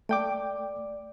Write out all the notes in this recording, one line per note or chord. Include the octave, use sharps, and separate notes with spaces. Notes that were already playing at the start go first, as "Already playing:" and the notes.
A3 D5 G5 D6